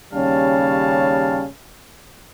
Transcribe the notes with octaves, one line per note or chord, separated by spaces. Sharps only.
D#2 C#3 G3 C#4 F5 A5